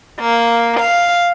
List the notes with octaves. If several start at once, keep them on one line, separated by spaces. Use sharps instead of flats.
A#3
F5